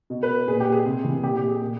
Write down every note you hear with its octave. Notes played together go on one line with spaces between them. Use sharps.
B2
B4
A#2 G#4
G4
G#4
C3
E3
A#2 G4
G4
G#4
A#2